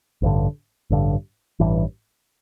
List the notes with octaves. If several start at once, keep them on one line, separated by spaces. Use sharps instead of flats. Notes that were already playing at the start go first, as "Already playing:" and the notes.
A1 G2 D3
A1 G2 D3
A1 G2 E3